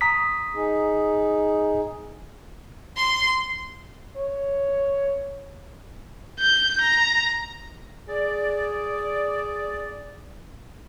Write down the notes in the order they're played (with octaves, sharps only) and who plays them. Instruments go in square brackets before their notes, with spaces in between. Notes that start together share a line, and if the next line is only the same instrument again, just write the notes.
[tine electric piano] A#5 D#6 B6
[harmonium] D#4 G#4
[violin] C6
[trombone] C#5
[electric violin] G6
A#5
[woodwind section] G#4 D5